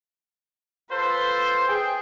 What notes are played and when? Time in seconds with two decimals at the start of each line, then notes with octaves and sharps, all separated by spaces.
0.92 F4 A4 B4 C5
1.68 G#4 G5